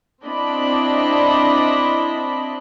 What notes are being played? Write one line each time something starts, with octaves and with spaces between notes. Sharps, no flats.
C4 D4 E4 D5 D#5 B5